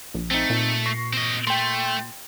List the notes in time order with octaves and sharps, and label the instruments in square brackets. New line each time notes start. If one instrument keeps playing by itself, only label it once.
[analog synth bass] A#1
[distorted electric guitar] A3 [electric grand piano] C4 D#4
[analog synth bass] A#2
[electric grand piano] C#6 A#6 C7
[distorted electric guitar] C4 D#5
[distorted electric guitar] A3 [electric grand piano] G5 C6